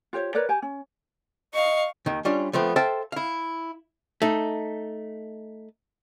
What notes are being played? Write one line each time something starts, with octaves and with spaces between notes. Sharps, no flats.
F4 G4 C5 C#5
A#4 B4 C#5 D5
G4 G#5
C#4
D#5 F5 C#6
D#2 D#3
G3 C#4 D4 F4
F3 A3 B3 C4
A4 C5 E5 F5 G5 A5
E4 F5
A3 D#4